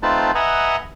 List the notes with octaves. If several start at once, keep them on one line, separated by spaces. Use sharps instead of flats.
A3 C4 D#4 F4 B4 A5
B4 D#5 E5 F#5 G#5 A#5